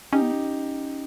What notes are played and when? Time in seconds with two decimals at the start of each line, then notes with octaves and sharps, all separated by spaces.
0.13 C#4 D#4 G4
0.22 B3
0.32 C#4